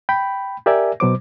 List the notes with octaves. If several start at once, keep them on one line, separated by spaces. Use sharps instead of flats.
G5 B5
G4 A#4 D5 E5 G#5
B2 F#3 C5 D6